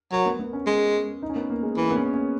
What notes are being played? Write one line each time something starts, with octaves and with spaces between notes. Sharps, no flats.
F#3 A#4
B3
B3
C#4
G#3 C#4
D#4
C#4
B3
A#3
G#3
E3 A#3
B3
C#4
C#4